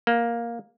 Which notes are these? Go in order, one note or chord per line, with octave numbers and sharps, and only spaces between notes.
A#3